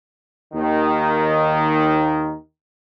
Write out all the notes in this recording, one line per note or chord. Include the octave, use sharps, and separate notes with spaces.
D#2 D#3